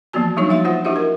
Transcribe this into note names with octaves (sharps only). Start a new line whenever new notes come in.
E3 F3 A#3 B3 F#4 A5
F#3 G3 D4 D#4 F#4 C#5
F3 A#3 E5 F5 C6
F4 C5 F#5
D4 E4 F#4 G4 D#5 E5
A#4